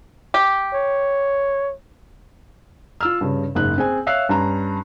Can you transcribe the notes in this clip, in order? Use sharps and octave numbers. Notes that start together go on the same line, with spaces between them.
G4
C#5
F4 E6 F6
G2 C#3
F#1 G#2 F#6
C4 G#4 G#5
C#5 E5 F5 E6 F#6 C7
G2 C#4 A#5